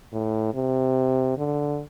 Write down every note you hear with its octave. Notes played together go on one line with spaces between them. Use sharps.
A2
C3
D3